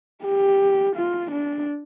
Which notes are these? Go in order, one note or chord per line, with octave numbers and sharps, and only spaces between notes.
G4
F4
D4